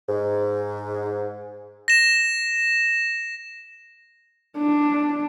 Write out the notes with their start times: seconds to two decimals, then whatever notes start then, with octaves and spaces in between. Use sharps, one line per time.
0.09 G#2
1.88 A#6 E7
4.58 D4